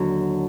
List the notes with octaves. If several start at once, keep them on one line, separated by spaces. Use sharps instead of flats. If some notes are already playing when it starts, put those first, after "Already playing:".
Already playing: D#2 D3 F#3